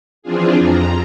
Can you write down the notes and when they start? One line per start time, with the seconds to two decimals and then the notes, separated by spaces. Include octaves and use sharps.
0.22 E3 F3 C4 D4 F4 G#4
0.58 F2 A#5